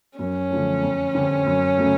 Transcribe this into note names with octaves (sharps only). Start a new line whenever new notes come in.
F#2 C#4
D3 F3 A3
F2
D3 G3 C4
F#2
C#3 F#3 A3